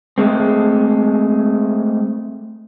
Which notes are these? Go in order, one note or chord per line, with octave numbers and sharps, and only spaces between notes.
G#3 A3 C4